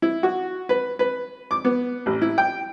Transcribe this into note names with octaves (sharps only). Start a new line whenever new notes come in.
E4
F#4
B4
B4
D6
B3
A1
E4
G5